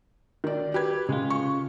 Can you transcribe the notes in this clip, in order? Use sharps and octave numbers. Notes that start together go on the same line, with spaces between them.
D#3 D5
G4 B4 G#6
C#3 G#3 F4
C#6